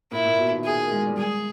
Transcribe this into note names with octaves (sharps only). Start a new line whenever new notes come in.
A#2 E4
A#2
B2
D#3
G#4
A#3
G#3
G3
G#3 G#4